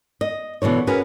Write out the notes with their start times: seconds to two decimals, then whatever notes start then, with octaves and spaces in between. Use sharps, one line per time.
0.21 D#5
0.62 B2 D3 E3 C#5
0.87 C#4 F#4 G#4 A#4 B4